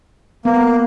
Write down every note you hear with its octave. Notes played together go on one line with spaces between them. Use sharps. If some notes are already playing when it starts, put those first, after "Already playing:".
A#3 B3